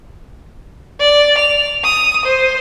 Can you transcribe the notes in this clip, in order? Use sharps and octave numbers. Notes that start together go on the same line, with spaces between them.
D5
F7
D#6
C5